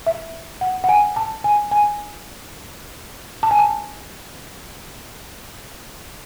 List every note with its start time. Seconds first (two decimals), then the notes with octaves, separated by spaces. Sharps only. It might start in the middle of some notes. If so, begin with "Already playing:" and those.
0.07 E5
0.61 F#5
0.84 F#5
0.89 G#5
1.16 A5
1.44 G#5
1.71 G#5
3.43 A5
3.51 G#5
3.59 A5